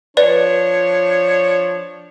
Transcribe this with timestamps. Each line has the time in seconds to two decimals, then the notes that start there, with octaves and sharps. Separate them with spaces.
0.17 F3 D4 B4 C#5 D5